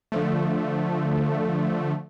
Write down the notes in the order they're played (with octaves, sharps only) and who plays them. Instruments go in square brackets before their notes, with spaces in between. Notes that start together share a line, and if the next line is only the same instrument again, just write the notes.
[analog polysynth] D3 F3 A3